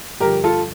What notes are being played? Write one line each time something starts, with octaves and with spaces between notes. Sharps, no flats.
G2 D3 F3 G4 A#4
F4 A4